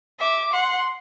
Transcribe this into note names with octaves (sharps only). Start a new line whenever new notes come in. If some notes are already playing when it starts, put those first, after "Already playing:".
E5 D6
F#5 C6